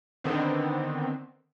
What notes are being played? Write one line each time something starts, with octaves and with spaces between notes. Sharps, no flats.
D3 D#3 B3 C4